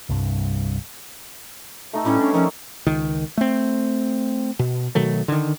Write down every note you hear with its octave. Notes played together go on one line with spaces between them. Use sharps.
C2 G2
A3 D#4 A4
A2 G3 C#4
D4 C#5 A5
D#3 F3 C#4
C#2 D#3
A3 C4
B2
B2 D#3 F#3 A3
D3 D#3